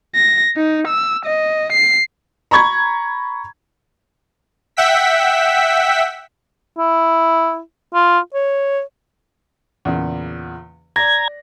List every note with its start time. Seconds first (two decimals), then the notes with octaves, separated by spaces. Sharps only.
0.15 A#6
0.57 D#4
0.87 E6
1.25 D#5
1.72 C7
2.51 A#5 B5 C#6 G#6
4.77 E5 F#5 G5 E6 B6
6.78 E4
7.94 F4
8.34 C#5
9.85 E2 A#2 C#3
10.96 D5 A#5 G#6 A#6